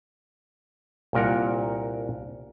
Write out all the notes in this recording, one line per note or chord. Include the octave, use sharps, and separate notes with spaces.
C2 A#2 A#4 F#5